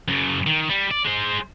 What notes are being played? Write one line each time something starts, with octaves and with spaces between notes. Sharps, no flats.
F#2 C#3
D#3
G3
D5
G#3 C5